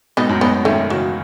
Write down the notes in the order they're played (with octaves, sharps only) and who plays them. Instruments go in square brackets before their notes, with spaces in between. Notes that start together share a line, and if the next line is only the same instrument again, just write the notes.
[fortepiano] G#2 B2 [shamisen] B3 D#4
[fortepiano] F#2 A2
[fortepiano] G#2 B2 [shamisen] B3 D#4
[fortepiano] B2 D#3 [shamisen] A3 C#4
[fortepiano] C#3 E3 [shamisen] F#3